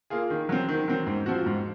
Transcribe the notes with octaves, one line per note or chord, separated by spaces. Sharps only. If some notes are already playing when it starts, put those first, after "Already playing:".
A#3 F4 G#4
D#3
F#3 C4
D#3
F#3 C4
G#2
F3 C4 F#4
G#2